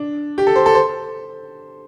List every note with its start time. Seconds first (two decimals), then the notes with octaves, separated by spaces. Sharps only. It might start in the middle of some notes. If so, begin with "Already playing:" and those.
Already playing: D4
0.38 G4
0.47 A4
0.56 C5
0.66 A4
0.75 C5